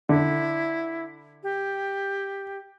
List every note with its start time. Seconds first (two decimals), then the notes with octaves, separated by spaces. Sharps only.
0.09 D3 E4
1.43 G4